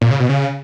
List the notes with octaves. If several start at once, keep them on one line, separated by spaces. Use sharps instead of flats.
A#2
C#3
B2
C#3